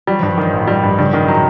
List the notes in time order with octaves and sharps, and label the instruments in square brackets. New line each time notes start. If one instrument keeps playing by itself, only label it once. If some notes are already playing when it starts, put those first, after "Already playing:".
[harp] F#3 [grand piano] G3
[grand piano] G2 [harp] F3
[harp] F#3
[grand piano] D#3 [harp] F3
[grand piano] A1
G3
G2
[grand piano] G2 [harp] C#3
[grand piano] D#3
F#3
[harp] A#2